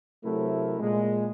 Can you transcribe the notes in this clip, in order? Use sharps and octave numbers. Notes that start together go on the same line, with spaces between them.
C3 F#3 A3 C4 E4 A#4
A#2 G#3